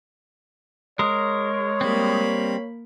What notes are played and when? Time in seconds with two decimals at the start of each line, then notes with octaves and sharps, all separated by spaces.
0.99 G#3 A#4 C#5
1.81 G3 A#3 C4 B5